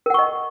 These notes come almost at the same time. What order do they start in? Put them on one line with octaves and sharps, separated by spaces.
A#4 F#5 C#6 D#5